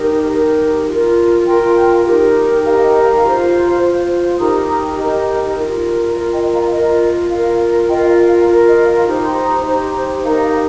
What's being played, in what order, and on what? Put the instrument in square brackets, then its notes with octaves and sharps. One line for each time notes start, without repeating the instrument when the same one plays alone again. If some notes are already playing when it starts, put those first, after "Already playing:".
Already playing: [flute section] D#4 G4 A#4
D#4 G4 A#4
F4 A#4
F4 A#4 G5 C6
D#4 G4 A#4
D#4 G4 A#4 F5 A#5
D#5 G5
F5 A#5
F4 C5
F4 C5
D#4 G4 A#4 A#5 D#6
A#5 D#6
D#4 G4 A#4 D#5
F4 A#4
F4 F5
A#4
D#5 G5
F5 A#5
F4 A#4 D#5
F4 A#4 F5
F4 A#4 D#5 G5
F5
F5
F4 A#4
D#5
F5
D#4 G4 C5
G5 C6
A#5 D#6
D#4 G4 C5
D#4 G4 A#4 F5 A#5
F5 A#5